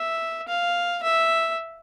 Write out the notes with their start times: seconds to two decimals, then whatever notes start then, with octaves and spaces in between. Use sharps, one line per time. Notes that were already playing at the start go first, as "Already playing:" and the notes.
Already playing: E5
0.48 F5
1.03 E5